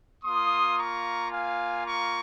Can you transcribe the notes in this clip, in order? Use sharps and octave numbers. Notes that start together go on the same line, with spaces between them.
A#3 F4 C6 D#6
A#5 C#6
F5 G#5
A#5 C#6